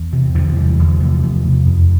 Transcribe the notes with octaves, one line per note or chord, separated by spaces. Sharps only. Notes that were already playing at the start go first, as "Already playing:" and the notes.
Already playing: E2
C3
E2 D3 F3
C3 E3 G3
E2 D3 F3
C3 F3 A3
E2
C3
F2